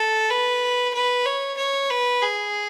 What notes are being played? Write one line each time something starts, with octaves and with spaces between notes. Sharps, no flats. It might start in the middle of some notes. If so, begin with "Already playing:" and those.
Already playing: A4
B4
B4
C#5
C#5
B4
G#4